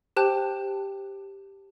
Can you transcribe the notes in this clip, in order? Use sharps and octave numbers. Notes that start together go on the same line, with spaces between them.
G4 C5 G5 A5 F#6